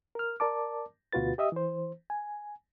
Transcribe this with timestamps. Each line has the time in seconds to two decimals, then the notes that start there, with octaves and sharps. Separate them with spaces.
0.15 A#4 F6
0.40 A#4 D5 A5 D6
1.13 D2 B2 F4 F#4 B4 A6
1.38 G4 D#5 E5 D#6
1.52 E3 C5
2.10 G#5